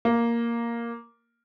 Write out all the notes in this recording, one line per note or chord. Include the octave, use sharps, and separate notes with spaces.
A#3